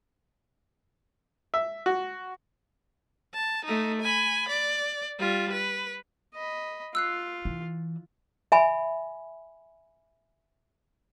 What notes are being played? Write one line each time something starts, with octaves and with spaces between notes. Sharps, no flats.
E5
F#4
A5
A3 D#4
G#5 B5
D5
G3 F4
B4
D#5 B5
F4 E6 F#6 C7
E3
E5 G#5 B5